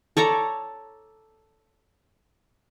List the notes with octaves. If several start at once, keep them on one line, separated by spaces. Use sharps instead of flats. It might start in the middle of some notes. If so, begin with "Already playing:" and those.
A4 C#5 D5 A#5